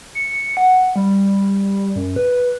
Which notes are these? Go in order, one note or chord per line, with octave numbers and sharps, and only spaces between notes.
C#7
F#5
G3
F#2
B4